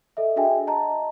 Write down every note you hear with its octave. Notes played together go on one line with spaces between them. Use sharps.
A4 D#5 E5
D4 F#4 G#4 E5 G5 G#5
D#5 A5 A#5